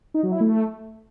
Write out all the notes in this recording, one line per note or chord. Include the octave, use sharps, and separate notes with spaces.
D#4
F#3
E4
A3